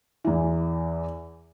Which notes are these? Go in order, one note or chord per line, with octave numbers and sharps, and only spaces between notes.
E2 E3